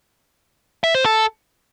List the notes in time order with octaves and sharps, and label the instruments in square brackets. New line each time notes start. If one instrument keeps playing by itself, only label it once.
[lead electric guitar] E5
C5
A4